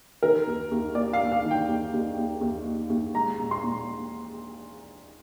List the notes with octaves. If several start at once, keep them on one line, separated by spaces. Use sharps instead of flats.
D#3 A#4
D#2
D#2
A#3 D5
F5
A#3
F5
D#3
G5
D#2
D#2
D#2
D#2
A#3
D#2
G#3 A#5
A#2
C6
A#2